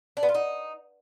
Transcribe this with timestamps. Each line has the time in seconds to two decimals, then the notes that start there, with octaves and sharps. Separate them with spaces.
0.17 D4
0.23 B3
0.29 F4
0.35 D#4